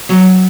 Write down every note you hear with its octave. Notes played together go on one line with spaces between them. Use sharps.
F#3